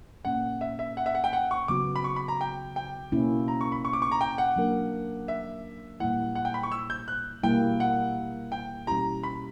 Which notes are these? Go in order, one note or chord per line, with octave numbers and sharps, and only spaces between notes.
A#2 A#3 C#4 F#5
E5
E5
F#5
E5
F#5
G5
F#5
C#6
C#3 F#3 B3 F#4 D6
B5
C#6
B5
A#5
G5
G5
B2 A#3 C#4 E4
A#5
C#6
B5
C#6
D6
C#6
A#5
G5
F#5
F#3 A#3 D4 A#4
E5
A#2 G3 A#3 E4 F#5
F#5
G5
B5
C#6
E6
G6
F#6
B2 G3 A#3 E4 G5
F#5
G5
B2 G3 C#4 E4 G4 A#5
B5